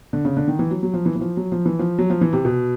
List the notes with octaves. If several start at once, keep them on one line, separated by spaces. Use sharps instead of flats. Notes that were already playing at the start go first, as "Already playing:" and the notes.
D3
C#3
D3
D#3
E3
F#3
F#3
F3
E3
E3
F3
F#3
F3
E3
F3
F#3
F3
E3
C3
B2